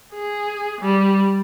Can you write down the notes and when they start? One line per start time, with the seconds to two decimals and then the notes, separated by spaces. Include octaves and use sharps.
0.13 G#4
0.81 G3